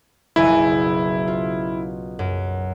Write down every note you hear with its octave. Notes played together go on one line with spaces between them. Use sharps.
F#1 B1 E4 G#5
F4
F#2